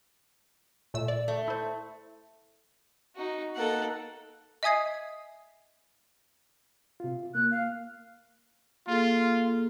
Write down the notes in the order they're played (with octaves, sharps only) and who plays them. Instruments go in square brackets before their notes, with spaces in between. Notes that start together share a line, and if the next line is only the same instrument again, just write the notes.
[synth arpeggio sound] A#2 A3 E6
D5
[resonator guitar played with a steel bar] A3
[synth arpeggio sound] E4 C5
[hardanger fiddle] D#4 F#4
[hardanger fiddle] A#3 D#4 [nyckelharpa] A4 F#5
[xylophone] D#5 E5 G#5 D#6 G#6 C7
[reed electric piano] C3 F4
[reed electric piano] A#3 [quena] F#6
[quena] F5
[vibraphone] A#3 G#4 A4 [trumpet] F4